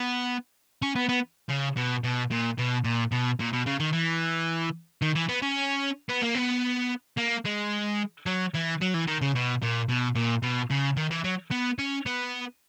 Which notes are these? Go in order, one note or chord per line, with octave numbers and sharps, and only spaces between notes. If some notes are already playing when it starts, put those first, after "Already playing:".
Already playing: B3
C#4
B3
B3
C#3
B2
B2
A#2
B2
A#2
B2
A#2
B2
C#3
D#3
E3
D#3
E3
B3
C#4
B3
A#3
B3
A#3
G#3
F#3
E3
F#3
E3
D#3
C#3
B2
A#2
B2
A#2
B2
C#3
D#3
E3
F#3
B3
C#4
B3